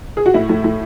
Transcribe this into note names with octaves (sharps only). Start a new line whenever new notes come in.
G#4
F#4
A2 E4
A2
A2